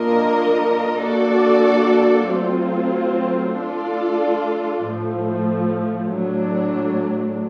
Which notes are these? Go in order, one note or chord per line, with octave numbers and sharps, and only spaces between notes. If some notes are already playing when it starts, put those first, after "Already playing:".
Already playing: A#3 D4 F4 A#4 D#5
A#3 D4 F#4 A4 D5
F#3 A3 C4 F4
A3 D4 F4 A4 D5
A2 F3 A3
A2 F#3 A3 D4